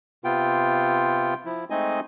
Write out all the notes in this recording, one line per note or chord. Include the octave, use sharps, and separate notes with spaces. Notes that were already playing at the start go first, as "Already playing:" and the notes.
C3 B3 F4 G5
F3 E4
G#3 A3 C4 D#4 D#5 G#5